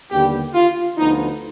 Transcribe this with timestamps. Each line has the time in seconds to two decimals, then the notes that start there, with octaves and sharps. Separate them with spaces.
0.11 D#2 D3 G3 B3 G4
0.54 F4
0.97 D2 D3 F3 B3 D#4